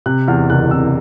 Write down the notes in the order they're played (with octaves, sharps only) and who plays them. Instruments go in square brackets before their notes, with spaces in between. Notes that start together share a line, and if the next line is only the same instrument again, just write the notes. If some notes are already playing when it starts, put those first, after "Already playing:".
[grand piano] C3 F#6
E2 F6
F#1 F#6
C3 E6